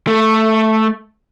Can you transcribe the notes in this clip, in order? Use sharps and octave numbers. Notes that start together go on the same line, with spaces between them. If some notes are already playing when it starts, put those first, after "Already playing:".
A3